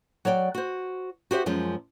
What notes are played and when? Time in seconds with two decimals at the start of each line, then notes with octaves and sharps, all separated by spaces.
0.25 F#3 C#5 D5 G5
0.55 F#4 C5
1.31 F#4 G4 C5 E5
1.46 F#2 F3 G#3 C#4